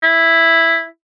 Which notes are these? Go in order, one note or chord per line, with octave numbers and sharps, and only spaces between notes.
E4